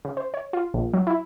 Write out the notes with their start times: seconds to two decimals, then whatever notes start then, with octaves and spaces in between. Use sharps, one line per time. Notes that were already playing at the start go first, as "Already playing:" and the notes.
0.05 C#3
0.17 C5
0.34 C#5
0.53 F4
0.74 A#1
0.94 F#3
1.07 E4